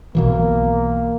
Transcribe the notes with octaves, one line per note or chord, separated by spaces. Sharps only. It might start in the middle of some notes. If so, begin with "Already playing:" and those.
B1 B2 E3 A#3